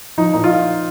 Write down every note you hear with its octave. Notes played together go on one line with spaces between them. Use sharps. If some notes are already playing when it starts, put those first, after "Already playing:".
F3 D#4
A#2 D#4
F4